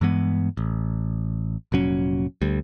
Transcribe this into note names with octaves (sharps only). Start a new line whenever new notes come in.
G2 E3 G#3 B3
A1
F1 A#2 F#3 C#4
D2 G3